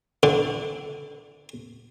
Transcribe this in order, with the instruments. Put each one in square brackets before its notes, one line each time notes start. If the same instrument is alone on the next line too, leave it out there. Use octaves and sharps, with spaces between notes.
[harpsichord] D3